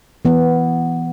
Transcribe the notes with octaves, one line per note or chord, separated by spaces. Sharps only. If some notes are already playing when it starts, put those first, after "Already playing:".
E3 B3